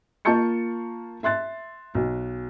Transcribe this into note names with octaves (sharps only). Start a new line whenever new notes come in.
A#3 F4 A5 C#6 G6 C#7
E5 C6 F#6 A6
B1